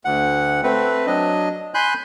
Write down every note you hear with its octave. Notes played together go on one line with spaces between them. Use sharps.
D2 F#5
A3 C4 B4
F#3 D4 D#5
G#5 B5 C6 F#6 G6